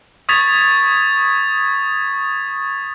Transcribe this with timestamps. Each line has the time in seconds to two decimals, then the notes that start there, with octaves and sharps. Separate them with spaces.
0.29 C#6 D#6 G#6 A6 B6 F7